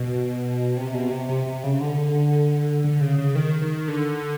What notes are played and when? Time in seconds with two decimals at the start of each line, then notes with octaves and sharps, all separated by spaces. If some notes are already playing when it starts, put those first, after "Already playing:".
Already playing: B2
0.77 C3
0.94 B2
1.11 C3
1.29 C3
1.46 C3
1.64 C#3
1.81 D3
2.84 D3
3.01 C#3
3.18 C#3
3.35 D#3
3.62 D#3
3.88 D3